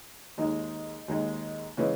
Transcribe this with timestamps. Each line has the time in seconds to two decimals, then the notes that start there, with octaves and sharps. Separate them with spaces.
0.38 D#2 D#3 G#3 D#4
1.08 D#2 D#3 G#3
1.77 C#3 E3 G#3 C#4